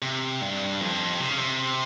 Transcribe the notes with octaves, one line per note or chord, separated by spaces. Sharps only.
C3
G2
F2
C3
C#3
C3